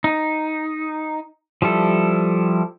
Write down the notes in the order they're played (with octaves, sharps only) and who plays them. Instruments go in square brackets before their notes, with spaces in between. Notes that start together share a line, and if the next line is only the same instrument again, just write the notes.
[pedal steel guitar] D#4
F3 G3 E4 A4